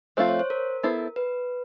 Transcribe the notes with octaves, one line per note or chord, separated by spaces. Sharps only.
F3 A3 C4 F4 C5
C#5
C5
A#4
B3 E4 A4 C5
B4